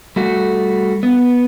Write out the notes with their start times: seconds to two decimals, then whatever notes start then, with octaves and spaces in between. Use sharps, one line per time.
0.16 G3 A3 F#4
1.03 B3